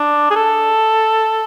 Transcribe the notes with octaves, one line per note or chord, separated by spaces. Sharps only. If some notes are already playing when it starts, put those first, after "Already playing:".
Already playing: D4
G#4
A4